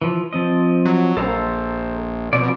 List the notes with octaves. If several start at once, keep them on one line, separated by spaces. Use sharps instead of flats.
E3 F3
F3 C4 D#5
F#3
A#1 A4 C5 A#5
B2 F3 C4 D5